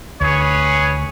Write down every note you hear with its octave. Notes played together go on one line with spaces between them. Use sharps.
D2 G#4 B4 C#5